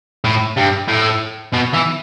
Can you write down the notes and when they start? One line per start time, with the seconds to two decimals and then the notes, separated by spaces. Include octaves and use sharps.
0.24 A2
0.57 G2
0.88 A2
1.53 B2
1.74 E3